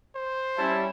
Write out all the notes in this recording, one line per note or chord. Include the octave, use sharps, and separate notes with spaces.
C5
G3 C#4 E4 A5